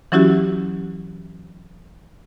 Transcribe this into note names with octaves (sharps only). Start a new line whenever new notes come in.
E3 F#3 C#4 E4 F#4 G4